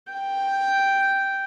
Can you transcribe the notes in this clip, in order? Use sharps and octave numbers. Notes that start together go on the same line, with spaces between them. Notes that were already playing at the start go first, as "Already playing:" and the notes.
G5